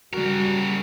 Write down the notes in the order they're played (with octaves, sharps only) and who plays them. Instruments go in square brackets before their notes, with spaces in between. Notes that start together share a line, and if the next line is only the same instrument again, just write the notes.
[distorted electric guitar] C#3 A#4 [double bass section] G3 [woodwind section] F#4